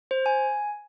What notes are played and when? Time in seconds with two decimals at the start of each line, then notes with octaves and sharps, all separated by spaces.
0.11 C5
0.26 G#5